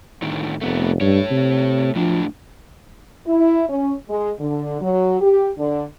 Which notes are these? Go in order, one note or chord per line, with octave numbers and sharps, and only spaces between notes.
A2 D3 D#3
F1 A3 B3
G2 A3 C#5
C3
A2 F3 D4
E4
C#4
G#3
D3
F#3
G4
D3